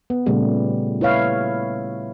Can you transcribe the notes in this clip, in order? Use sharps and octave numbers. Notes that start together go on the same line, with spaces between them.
B3
A#2 C#3 G3 A3
E4 B4 C#5 F5